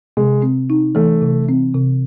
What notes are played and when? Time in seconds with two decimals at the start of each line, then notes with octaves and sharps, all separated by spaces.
0.17 C3 G#3
0.42 C4
0.70 D#4
0.95 E3 A3
1.22 C3
1.49 C4
1.75 C3